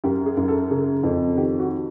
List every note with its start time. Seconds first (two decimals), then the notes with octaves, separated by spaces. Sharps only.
0.04 F#2 G4
0.26 G#4
0.37 F#2
0.48 A4
0.70 C#3 G#4
1.03 F2
1.37 D#3 G4
1.59 F#4